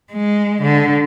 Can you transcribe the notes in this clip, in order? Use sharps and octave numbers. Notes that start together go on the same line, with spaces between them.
G#3
D3